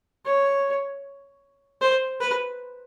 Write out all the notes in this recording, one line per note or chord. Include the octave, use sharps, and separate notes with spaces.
C#5
C5
B4